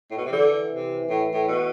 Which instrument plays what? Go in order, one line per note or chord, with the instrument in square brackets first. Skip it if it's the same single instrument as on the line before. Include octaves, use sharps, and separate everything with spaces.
[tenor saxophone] A2
B2
C3
[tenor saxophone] D3 [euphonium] E3
[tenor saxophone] C3
A2
A2
B2